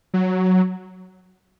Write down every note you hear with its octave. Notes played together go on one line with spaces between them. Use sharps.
F#3